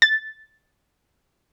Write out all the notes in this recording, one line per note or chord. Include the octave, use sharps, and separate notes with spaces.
A6